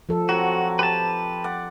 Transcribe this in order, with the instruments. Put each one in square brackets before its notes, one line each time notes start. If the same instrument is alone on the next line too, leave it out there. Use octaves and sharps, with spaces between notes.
[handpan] F3 A4
[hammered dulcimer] F#3 C4 [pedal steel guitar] F#4
[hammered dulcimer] G4 [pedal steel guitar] B4 A5
[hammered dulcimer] D5 F#5